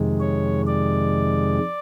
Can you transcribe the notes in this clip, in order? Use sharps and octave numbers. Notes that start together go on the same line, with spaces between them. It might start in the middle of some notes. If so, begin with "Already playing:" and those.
Already playing: F2 C3 D#3 G#3
C#5
D5